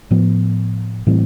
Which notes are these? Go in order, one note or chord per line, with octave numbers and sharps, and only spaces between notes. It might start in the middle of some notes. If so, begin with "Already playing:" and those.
A2 F3 B3
A2 E3 G3 C4